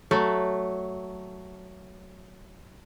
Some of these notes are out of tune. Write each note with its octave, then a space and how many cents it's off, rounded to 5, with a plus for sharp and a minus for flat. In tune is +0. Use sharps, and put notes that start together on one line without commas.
F#3 +10 A3 +0